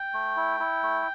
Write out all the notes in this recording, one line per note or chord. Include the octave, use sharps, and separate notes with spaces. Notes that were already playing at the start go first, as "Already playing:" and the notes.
Already playing: G5
A3
E4
E4
A3